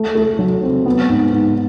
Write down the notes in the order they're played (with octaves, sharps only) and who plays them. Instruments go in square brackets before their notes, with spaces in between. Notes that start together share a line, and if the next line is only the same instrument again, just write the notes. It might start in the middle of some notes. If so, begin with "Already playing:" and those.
Already playing: [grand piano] A3
A3
F#3
C4
B3
G#2
G#2